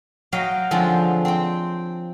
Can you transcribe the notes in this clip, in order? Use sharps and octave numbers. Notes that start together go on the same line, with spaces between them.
F#3 D#5 F5 G5
D3 F3 G#3 C4
C4 G5